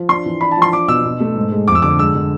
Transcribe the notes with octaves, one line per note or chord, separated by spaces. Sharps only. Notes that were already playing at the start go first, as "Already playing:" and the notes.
Already playing: F3
D4 C6
E3
D4 B5
A5
F3 C6
D4 D6
B2 E6
B2
A3
G#2
G#3
F2 D6
E6
D3 D6
G#3 E6
D3